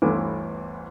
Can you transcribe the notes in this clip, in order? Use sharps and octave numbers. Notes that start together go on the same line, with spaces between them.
G1 D2 E3 B3 D6